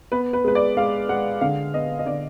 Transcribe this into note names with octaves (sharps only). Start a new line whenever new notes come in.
B3 B4
B4
G#3 B4
D5
G#3 F5
G#3 F#5
D3 F5
B3 D#5
D#5
D3 D5